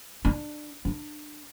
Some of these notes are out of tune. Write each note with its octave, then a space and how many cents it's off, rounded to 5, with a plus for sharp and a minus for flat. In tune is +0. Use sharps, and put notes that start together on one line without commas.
D4 +25
D4 +25